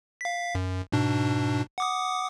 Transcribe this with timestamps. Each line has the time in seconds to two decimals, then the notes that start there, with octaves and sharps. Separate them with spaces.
0.21 F5 B6
0.55 F#2
0.92 G#2 B2 D4
1.78 F#5 D6 D#6